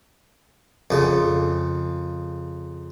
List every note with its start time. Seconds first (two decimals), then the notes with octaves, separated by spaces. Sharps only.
0.91 F2 C#3